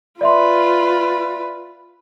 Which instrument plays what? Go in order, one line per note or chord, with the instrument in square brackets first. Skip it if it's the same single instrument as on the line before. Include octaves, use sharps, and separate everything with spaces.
[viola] F4 B4 [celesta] D5 E5 C6